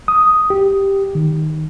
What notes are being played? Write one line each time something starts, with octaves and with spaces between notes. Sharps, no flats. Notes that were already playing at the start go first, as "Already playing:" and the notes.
D#6
G4
D#3